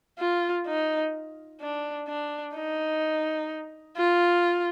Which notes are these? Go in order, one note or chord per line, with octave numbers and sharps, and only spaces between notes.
F4
D#4
D4
D4
D#4
F4